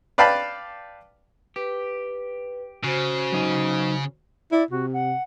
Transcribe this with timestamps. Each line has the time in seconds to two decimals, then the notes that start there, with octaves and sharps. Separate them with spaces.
0.18 B4 D5 F5 G5 A5 B5
1.56 G4 B4
2.84 C#3 F#4 C5
3.32 F#3 D#4 G#5
4.52 E4 D5
4.71 C3 F#4
4.93 F#5